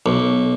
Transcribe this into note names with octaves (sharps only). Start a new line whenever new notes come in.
B1